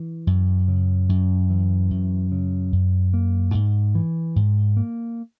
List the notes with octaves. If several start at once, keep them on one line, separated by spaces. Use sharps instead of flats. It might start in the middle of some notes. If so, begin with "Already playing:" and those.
Already playing: E3
F#2
C#3
F#2
E3
F#2
C#3
F#2
A#3
G#2
E3
G#2
A#3